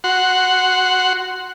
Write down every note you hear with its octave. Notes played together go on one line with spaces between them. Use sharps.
F#4 F#5 C6